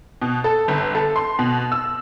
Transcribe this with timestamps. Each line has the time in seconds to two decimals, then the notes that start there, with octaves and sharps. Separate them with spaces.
0.22 B2
0.44 A4
0.68 G1
0.95 A4
1.16 C6
1.39 B2
1.72 E6